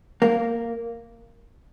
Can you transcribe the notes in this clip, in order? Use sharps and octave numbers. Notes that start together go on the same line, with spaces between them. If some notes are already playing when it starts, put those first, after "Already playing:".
A#3